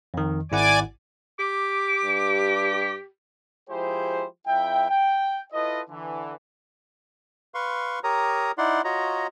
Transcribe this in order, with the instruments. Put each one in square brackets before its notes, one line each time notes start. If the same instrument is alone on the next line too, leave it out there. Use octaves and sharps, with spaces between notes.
[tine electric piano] F2 D#3
[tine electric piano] G#1 E4 F#5 [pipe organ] D5 G#5 D6
[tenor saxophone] G4 [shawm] D6
[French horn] G2
[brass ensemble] F3 G#3 E4 G4 G#4 C5
F2 E4 E5 G5
G5
E4 F4 A4 B4 D#5
D3 E3
[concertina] B4 F5 C6 C#6
G4 A#4 C#5 A#5 D#6
D#4 E4 D5 F#5 C6
F4 F#4 C#5 D#5 A#5